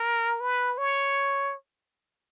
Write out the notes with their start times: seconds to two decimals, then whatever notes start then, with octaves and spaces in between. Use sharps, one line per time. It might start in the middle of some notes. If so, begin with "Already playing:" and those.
Already playing: A#4
0.40 B4
0.78 C#5